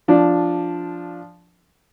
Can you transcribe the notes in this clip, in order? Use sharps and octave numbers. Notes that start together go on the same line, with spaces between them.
F3 D4